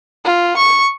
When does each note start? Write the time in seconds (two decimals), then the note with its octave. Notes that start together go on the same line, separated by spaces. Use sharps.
0.25 F4
0.57 C#6